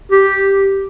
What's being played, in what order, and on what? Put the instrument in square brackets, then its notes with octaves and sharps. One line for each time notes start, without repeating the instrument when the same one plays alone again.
[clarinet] G4